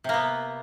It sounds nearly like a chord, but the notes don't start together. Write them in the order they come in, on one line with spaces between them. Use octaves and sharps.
C3 A#3 B3